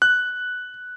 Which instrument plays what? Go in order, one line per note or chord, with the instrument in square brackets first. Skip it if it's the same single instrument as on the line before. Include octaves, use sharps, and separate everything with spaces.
[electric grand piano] F#6